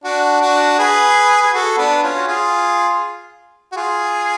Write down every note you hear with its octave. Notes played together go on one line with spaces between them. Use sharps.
D4 F#4
D4 F#4
G#4 B4
G#4
F#4 A4
B3 D4
C#4 F4
F#4
F4 G#4
F#4
F4 G#4